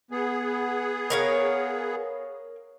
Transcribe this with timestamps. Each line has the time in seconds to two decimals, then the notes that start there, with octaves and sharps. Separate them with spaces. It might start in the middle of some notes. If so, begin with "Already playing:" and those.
0.11 B3 G#4
1.10 A#4 C#5 F5